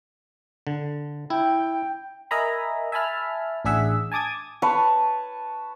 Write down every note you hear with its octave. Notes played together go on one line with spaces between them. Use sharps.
D3
E4 G5
A#4 D#5 E5 G#5 A#5 B5
E5 G#5 A5 B5 F6
A1 D4 G#4 E5 F#5 E6
G#5 A5 D6 D#6 G#6
B4 C#5 A5